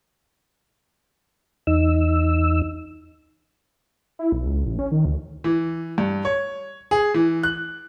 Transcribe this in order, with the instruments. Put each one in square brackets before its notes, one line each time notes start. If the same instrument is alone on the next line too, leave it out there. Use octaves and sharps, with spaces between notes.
[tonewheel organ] E2 D#4 E6
[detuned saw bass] E4
B1
C#2
A1
C#4
D#3
D2
[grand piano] E3
G2
C#5
G#4
E3
F#6